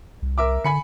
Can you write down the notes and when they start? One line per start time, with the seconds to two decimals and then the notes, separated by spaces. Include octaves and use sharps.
0.22 C2
0.38 A#4 E5 D6
0.64 D3 G#5 B5 C#7